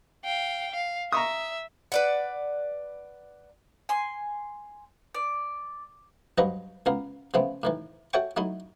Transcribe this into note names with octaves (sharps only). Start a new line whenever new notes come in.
F5 G5
F5
E5 A#5 C#6 D#6
B4 D5 F#5
G#5 C6
D5
G2 F3 F#3 B4 D#5 A#5
C#2 B3 A#4 F5
C#3 F3 A3 B3 C4
A2 D#3 E3
F#4 A4 C#5 E5 G5 C#6
F#3 A3 D#4 E4